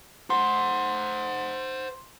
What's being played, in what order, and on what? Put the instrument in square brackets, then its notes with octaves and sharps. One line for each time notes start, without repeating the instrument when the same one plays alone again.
[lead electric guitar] C5 F#5 [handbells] C6